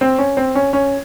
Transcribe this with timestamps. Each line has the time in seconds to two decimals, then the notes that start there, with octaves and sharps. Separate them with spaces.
0.01 C4
0.18 C#4
0.37 C4
0.55 C#4
0.73 C#4